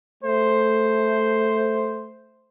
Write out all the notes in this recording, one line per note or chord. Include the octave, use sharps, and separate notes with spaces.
A3 C5